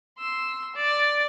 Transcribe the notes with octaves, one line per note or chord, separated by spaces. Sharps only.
C6 E6
D5